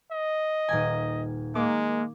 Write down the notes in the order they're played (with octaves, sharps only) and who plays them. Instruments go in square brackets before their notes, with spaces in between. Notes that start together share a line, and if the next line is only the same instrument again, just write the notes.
[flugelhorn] D#5
[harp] D#1 A#3 G#5
[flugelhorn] G#3 [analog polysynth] A#3 [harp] D6